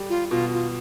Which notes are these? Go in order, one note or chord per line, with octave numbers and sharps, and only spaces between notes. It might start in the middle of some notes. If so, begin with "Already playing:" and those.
Already playing: G3 G4
F4
B2 F4
F4